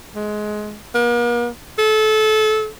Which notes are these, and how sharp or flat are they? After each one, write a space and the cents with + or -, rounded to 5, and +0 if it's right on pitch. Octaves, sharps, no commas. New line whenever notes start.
G#3 +20
A#3 +45
A4 -25